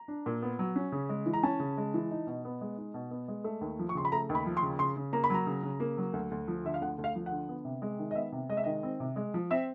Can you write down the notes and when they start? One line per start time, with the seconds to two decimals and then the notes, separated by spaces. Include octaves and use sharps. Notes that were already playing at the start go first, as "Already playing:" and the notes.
Already playing: A#5
0.08 D4
0.26 A#2
0.42 B3
0.59 F#3
0.76 C#4
0.92 C#3
1.09 G#3
1.26 E3
1.33 A#5
1.43 C#4 A5
1.60 C#3
1.77 G#3
1.94 E3
2.11 D#4
2.27 B2
2.45 B3
2.61 G#3
2.77 D#4
2.94 B2
3.11 B3
3.28 G#3
3.44 A3
3.61 D#2
3.79 F3
3.89 C#6
3.95 C#3 C6
4.05 B5
4.12 A3 A#5
4.29 D#2
4.35 B5
4.46 F3
4.57 C6
4.63 C#3
4.79 C#3 C6
4.96 C#3
5.13 A#3 A#5
5.24 B5
5.30 F#3 A#5
5.47 C#3
5.63 C#3
5.80 A#3
5.98 F#3
6.13 D2
6.31 D2
6.48 F3
6.64 D3 E5
6.74 F5
6.81 D2 F#5
6.98 D2
7.04 F5
7.15 F3
7.26 D3 F#5
7.49 B3
7.65 C3
7.82 G#3
7.99 D#3
8.11 D#5
8.15 B3 E5
8.32 C3
8.49 G#3 D#5
8.57 E5
8.64 D#3 D#5
8.83 C4
9.00 C3
9.16 G#3
9.34 F3
9.51 C4 E5